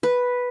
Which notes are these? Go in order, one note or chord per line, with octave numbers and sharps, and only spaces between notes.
B4